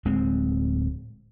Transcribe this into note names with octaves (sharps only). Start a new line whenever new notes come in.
D1 G#3 C4